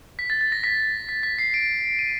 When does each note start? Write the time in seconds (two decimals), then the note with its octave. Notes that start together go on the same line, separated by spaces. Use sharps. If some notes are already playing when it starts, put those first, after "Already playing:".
0.19 B6
0.30 A6
0.41 A6
0.52 A#6
0.64 B6
1.09 B6
1.23 B6
1.38 C7
1.54 D7
1.99 D#7